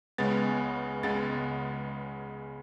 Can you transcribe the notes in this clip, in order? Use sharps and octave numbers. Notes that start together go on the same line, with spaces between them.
C#2 C#3 G#3 B3 A6
C#2 C#3 G#3 B3 A6